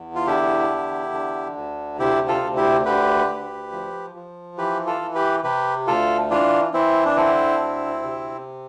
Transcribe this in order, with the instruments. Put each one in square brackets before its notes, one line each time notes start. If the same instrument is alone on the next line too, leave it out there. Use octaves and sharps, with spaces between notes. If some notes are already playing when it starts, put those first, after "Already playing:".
Already playing: [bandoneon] E2
F4
D3 E4 G4
E2
D3
D2
C3 E4 G4
F4 A4
D2
E4 G4
D3 G4 B4
D2
F3
F3
E3 G4 B4
F4 A4
E3
G4 B4
C3 G4 B4
D2 F4 A4
E3 D4 F4
E3 C4 E4
D4
D3 C4 E4
D2
C3